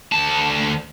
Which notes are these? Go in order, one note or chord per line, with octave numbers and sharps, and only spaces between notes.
D2 A5